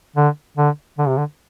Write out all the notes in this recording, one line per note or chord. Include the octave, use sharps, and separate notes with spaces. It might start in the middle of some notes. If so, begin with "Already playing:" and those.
D3
D3
D3
C3
D3